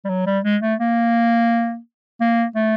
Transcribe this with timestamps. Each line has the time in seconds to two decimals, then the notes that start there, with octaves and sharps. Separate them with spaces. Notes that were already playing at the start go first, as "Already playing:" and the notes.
0.05 G3
0.09 F#3
0.26 G3
0.44 G#3
0.62 A3
0.80 A#3
2.21 A#3
2.55 A3